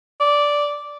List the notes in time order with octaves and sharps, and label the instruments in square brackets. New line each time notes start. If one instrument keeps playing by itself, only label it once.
[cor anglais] D5